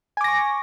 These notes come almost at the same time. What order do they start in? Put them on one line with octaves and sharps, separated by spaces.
G#5 D6 A#6 C#6